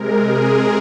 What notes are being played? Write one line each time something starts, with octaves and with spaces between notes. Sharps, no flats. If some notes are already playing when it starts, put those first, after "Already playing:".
Already playing: C3 G#3 A#4
G#4